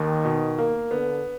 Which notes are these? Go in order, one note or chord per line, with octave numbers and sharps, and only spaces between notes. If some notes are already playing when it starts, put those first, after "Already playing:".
Already playing: D#2 D#3
B2
A#3
D3 B3